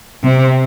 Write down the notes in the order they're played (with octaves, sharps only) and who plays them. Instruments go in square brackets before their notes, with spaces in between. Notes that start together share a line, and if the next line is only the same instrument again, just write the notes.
[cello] C3